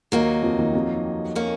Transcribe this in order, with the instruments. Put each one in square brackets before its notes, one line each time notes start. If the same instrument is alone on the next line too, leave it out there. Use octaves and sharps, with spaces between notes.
[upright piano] D#2 D#3 [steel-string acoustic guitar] F#3 A#3 D#4
[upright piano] F2 F3
D#2 D#3
F2 F3
[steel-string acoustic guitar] D#3 A#3 C#4